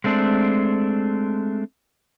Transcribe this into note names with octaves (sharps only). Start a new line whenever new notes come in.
G#3 A3 C4 D4